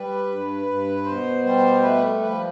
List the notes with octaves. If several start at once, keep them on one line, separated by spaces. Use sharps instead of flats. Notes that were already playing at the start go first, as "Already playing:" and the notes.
Already playing: G3 B4
G2
G2
B2 C5
G3 C5
A3 B4
F3 B4